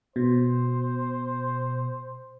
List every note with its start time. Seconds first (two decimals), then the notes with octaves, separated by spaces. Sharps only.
0.16 B2 C5